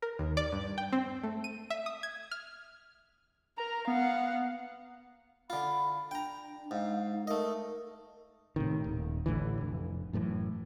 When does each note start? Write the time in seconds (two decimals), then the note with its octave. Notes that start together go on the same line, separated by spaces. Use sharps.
0.02 A#4
0.19 D#2
0.37 D5
0.53 G2
0.78 G5
0.93 C4
1.23 A3
1.44 D#7
1.70 E5
1.86 D#6
2.03 G#6
2.31 F6
3.58 A#4 A#5
3.87 B3 F5 F#5
5.50 D3 F4 B5
6.11 D4 G5 A#5
6.71 G#2 F5
7.13 D#4
7.27 A3 A#4 D#5
8.56 A2 C3 D#3
8.84 D#1
9.26 A1 A2 D3 E3
9.61 F1
10.13 F#2 A2 D3 E3